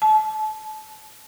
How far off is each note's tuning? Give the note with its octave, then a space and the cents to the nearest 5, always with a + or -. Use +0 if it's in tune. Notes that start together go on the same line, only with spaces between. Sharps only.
A5 -30